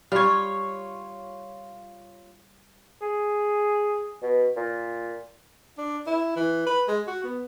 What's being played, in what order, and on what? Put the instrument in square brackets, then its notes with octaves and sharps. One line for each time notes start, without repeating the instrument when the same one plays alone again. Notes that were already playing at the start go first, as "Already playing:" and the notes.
[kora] G3 [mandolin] F4 C#5
[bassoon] G#4
B2
A#2
[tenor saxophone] D4
E4
E3
B4
G#3
F#4
B3